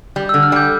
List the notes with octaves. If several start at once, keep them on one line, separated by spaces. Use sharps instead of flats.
G3
D3 E6
F6
G3 G6